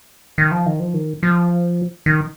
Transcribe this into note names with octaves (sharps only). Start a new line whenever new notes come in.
D#3
F3
D#3
F3
D#3
F3
D#3